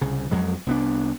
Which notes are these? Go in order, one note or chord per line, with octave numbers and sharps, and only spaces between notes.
C2 C#3
F2 F#3 G#3
C2 B3 D4